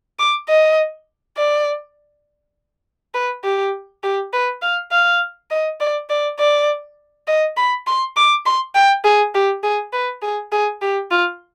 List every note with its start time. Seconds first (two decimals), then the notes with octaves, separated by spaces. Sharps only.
0.19 D6
0.49 D#5
1.37 D5
3.14 B4
3.44 G4
4.03 G4
4.33 B4
4.62 F5
4.92 F5
5.50 D#5
5.80 D5
6.10 D5
6.39 D5
7.28 D#5
7.57 B5
7.87 C6
8.16 D6
8.46 C6
8.75 G5
9.04 G#4
9.34 G4
9.64 G#4
9.93 B4
10.22 G#4
10.52 G#4
10.82 G4
11.11 F4